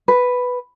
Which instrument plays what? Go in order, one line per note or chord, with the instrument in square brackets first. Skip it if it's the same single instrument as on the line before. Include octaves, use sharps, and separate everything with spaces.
[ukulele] B4